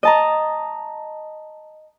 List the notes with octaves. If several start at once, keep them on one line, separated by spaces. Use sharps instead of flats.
D#5 A5 A#5